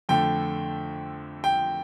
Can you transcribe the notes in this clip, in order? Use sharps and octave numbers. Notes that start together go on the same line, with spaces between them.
F2 D3 A3 G5
G5